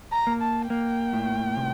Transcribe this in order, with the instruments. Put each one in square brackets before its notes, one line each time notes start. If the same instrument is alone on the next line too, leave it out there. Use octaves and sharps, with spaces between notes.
[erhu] A#5
[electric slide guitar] A#3
[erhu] A5
[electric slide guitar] A#3 [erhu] G5
[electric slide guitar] A2
C3